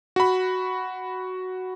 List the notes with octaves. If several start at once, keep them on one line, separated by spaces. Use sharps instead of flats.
F#4 B5